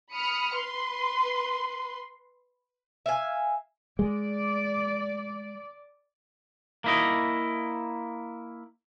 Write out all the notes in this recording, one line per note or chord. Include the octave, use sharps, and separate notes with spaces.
B5 D#6 F6 C#7
B4 C6
E5 F5 G#5
G#3 D5
A#3 E4 D#5